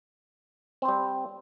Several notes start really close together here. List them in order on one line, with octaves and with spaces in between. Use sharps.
C4 C5 G3